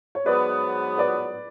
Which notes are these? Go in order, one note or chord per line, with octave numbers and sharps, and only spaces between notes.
C#5
G#2 F#3 B3 B4 D5
B4 D5